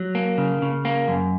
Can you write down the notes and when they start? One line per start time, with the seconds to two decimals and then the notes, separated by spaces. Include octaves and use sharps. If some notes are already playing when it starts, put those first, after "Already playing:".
Already playing: F#3
0.15 A#3
0.38 C#3
0.62 C#3
0.85 A#3
1.08 F#2